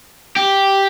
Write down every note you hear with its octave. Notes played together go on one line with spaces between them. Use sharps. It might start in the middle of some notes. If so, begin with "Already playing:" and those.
G4